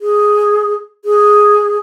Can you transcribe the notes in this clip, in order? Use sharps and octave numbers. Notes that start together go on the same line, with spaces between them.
G#4
G#4